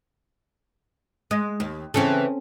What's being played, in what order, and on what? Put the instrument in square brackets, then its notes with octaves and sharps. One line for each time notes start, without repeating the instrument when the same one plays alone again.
[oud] G#3 [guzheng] D#5
[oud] D#2
[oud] C#3 E3 [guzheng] C4 C#4 A4